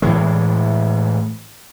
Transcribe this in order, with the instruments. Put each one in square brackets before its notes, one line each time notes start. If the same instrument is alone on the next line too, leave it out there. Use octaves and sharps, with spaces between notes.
[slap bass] A2 E3 G#3